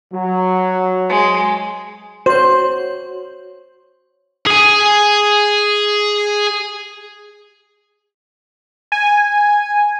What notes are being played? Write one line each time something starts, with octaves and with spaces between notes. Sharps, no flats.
F#3
G#3
F#4 C5 C#5
G#4 G#5
G#5